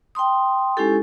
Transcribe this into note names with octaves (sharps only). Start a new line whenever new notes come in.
G5 A5 C6 D#6
G#3 C#4 D#4 E4 G4 A4